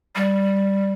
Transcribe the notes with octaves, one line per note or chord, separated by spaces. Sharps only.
G3